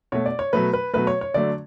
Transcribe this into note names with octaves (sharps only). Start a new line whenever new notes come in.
B2 A3 C#5
D5
C#5
B2 F#3 A3 B4
B4
B2 F#3 A3 B4
C#5
C#5
D3 F#3 A3 D5